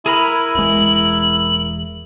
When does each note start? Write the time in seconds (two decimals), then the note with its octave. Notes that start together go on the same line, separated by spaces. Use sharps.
0.06 E4 G#4 A#4 B5
0.55 E1 E2 G#3 F#7